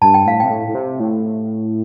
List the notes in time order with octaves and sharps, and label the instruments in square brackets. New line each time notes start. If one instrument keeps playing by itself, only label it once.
[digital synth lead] G2 [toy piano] A5
[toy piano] G5
[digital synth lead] A2 [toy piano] F5
[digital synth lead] C3 [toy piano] G5
[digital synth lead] A2
A2
C3
A2